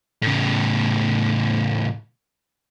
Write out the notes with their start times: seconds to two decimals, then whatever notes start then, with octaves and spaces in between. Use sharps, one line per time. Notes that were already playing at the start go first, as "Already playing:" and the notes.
0.22 A2 C#3